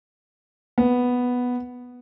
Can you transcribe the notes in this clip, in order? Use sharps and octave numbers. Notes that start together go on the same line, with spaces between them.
B3